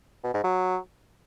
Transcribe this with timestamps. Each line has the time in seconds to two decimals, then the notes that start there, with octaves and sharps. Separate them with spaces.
0.24 B2
0.34 G#2
0.44 F#3